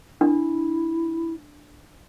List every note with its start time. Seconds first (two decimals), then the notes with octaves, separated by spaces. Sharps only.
0.21 D4 E4